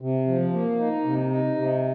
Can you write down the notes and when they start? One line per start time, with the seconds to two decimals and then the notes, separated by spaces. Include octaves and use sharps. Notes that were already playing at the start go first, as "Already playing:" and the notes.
0.01 C3
0.27 F3
0.53 A#3
0.79 D#4
1.05 C3
1.30 D#4
1.56 C3